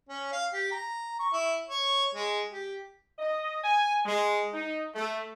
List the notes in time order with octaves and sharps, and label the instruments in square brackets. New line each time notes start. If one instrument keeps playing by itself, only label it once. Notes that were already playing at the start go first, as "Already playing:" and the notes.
[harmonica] C#4
F5
G4
A#5
C#6
E4
C#5
G#3
G4
[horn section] D#5
G#5
G#3
D#4
A3